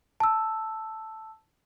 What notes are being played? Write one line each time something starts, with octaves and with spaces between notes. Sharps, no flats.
A5 E6